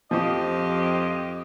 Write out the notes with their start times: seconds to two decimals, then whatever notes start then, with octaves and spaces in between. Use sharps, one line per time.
0.11 F2 F3 G4 D#5